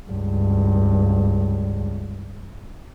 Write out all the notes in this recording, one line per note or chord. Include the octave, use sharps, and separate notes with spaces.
C#2 G2